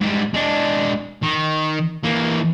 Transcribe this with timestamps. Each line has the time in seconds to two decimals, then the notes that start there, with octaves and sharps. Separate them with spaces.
0.01 G#2 G3
0.34 G#3 D4
1.23 D#3
2.03 E3 A#3